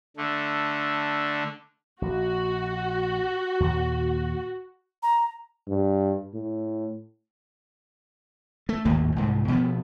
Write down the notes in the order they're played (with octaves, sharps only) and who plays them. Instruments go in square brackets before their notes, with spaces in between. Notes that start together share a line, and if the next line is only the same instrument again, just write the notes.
[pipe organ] D3 A3
[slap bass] A#1 [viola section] F#4
[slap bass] D#2 A#2 A#3
[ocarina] A#5
[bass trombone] G2
A2
[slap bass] A3
G#1 D#2 A2 A#3
C2 G#2
B2 F3 B3